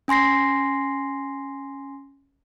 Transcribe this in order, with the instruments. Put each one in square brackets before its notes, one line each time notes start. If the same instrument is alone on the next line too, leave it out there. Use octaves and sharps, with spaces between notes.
[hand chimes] C#4 G#5 C6 A#6 C7